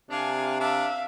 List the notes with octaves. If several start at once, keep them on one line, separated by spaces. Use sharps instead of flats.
C3 D4 F5 G#5
D4 E5 F5